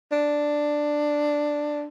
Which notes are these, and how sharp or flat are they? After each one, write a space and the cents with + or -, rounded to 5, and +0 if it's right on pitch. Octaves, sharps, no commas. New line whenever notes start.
D4 +5